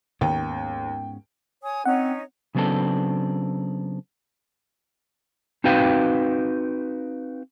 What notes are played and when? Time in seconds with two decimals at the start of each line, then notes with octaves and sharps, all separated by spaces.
0.21 D#2 G#2 B3 C#4 G5
1.63 C#5 G#5 D#6
1.85 C4 C#4 D#4 C#5 F#5
2.55 C#3 F#3 B3 C4 D4 A4
5.64 C4 D#4 F#4 B4 F5 G5